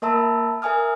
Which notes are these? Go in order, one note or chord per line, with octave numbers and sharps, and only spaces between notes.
A#3 A#4 E5 A5 B5 E6
A#4 E5 G#5 D#6 F6